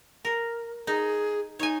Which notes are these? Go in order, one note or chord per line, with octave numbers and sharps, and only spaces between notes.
A#4
D#4 G#4
D#4 C#5 G#5